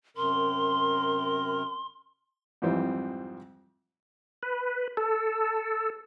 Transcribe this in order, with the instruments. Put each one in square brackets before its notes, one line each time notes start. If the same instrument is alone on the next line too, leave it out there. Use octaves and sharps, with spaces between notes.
[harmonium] F#2 C3 A#4 [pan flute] C6
[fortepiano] F2 G#2 E3 F3 G3 C4
[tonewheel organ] B4
A4